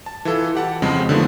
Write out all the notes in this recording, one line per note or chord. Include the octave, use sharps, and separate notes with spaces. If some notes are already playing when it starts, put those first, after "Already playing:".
A5
E3 E4 F4 A4
G4 F#5 A5
F2 C#3 G#3 C4 C#4
D3 D#3 F3 A3 B3